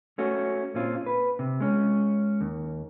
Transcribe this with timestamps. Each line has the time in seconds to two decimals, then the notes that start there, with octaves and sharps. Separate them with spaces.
0.18 A3 C#4 F#4
0.74 A#2 C4 C#4 F4
1.06 B4
1.39 C3
1.60 G#3 C#4
2.41 D#2